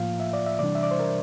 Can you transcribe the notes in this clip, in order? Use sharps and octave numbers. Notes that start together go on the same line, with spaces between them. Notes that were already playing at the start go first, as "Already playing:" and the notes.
Already playing: A2 F3 A#3 F4 F5
E5
D5
E5
C3 E3 G3 D4 D5
E5
D5
C5
A#4